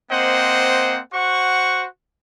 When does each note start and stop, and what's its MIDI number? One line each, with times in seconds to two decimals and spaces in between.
0.11 1.01 58
0.11 1.01 60
0.11 1.01 72
0.11 1.01 75
0.11 1.01 78
1.14 1.87 66
1.14 1.87 72
1.14 1.87 78
1.14 1.87 85